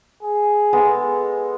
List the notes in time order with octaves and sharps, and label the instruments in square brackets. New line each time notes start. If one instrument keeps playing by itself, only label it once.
[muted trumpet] G#4
[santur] G#3 B3 A4